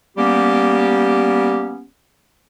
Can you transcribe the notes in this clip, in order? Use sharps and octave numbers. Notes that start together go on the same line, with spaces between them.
G3 A#3 B3 C#4 G4